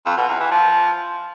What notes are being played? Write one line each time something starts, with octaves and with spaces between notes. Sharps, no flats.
F2
B2
E2
E3
F3